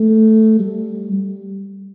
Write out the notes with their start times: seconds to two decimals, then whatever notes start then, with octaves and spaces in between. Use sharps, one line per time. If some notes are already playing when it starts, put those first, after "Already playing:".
Already playing: A3
0.59 G3
1.12 G3